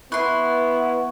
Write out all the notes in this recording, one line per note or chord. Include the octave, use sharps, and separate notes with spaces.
B3 E4 B4 C6 C#6